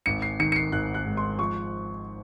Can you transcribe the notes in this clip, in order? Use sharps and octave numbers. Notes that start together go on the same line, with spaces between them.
G#1 C#7
C7
D#3 C#7
C#7
C7
G#1 F#6
F#6
G#2
C6
F3 C#6